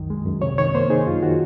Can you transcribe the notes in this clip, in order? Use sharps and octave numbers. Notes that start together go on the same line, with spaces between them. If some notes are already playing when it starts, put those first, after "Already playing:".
Already playing: C2 F#2 D#3
G#3
F#2
C3 C#5
D#3 C#5
A#3 C5
D#4 G#4
F#2 F4
D#3 F#4